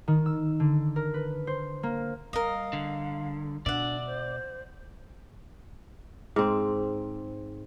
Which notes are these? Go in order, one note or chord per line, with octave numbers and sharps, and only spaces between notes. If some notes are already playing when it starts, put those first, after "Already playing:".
D#3
E6
D3
A#4
B4
C5
A#3
G3 A#4 D#5 F5
D3
B2 D4 D5 E5 F#5
C5
G#2 C4